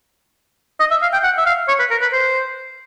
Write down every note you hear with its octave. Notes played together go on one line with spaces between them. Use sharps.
D#5
E5
F5
G5
F#5
E5
F5
C#5
B4
A#4
B4
C5